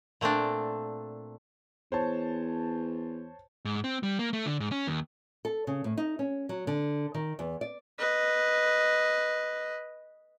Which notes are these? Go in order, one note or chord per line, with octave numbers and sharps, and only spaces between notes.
A#2 A3 C4 D4
E2 C5 C#5 A5
G#2
C4
G3
A#3
A3
D3
G#2
C#4
D#2
A4
C#3
A2
D#4
C#4
F#3
D3
D#3
E2
D5
B4 D#5